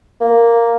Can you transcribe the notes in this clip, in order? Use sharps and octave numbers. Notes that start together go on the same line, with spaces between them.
A#3